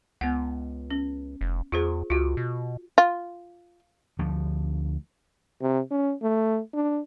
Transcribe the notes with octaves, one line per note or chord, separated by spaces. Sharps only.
C#2 B3 F#5
C#4
F1
E2 F4 G#4 C5
C#2 F4 F#4
B2
F4
D2 F3 A3
C3
C#4
A3
D4